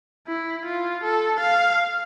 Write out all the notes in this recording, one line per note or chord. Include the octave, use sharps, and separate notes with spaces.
E4
F4
A4
F5